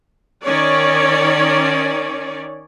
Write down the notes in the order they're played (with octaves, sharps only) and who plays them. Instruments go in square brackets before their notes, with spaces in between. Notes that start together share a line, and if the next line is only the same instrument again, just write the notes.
[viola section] D#3 C#4 C#5 D5